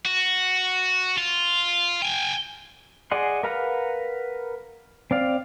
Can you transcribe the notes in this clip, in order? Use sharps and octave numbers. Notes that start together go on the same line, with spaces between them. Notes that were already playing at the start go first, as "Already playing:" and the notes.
F#4
F4
G5 G#5
G#4 D5 D#5 F#5 C6
A#4 B4 F5 F#5 A#5
C4 D5 F5